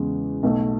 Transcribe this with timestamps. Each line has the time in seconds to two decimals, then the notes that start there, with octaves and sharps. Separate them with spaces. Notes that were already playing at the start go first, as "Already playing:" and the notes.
Already playing: E2 C#3 G#3
0.43 B1 B2 A3